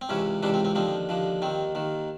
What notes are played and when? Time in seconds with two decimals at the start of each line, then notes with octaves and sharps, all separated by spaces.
0.01 C4
0.09 C#2 C3 E3 C#4
0.43 C#2 C3 E3 D4
0.54 C4
0.65 C4
0.75 D#2 D3 F3 C4
1.09 D#2 D3 F3
1.42 D#2 D#3 C4
1.75 D#2 D#3